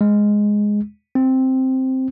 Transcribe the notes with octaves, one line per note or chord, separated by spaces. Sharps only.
G#3
C4